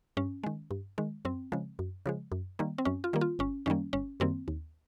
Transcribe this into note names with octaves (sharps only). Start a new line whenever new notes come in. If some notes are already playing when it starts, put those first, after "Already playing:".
G2 C#4
D#3 G#3
G2
D#3 G#3
F#2 C4
C#3 F3 G#3
F#2
C#3 F3 G#3
F#2
D#3 G3 A#3
C4
F#2 C#4
F4
D#3 G3 A#3
F4
G1 C#4
F#2 D#3 G3 A#3 C#4
G1 C#4
F#2 D#3 G3 A#3 C4
D#2